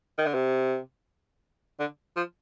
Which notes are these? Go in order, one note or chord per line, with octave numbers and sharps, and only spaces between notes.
D#3
D3
C3
D3
F3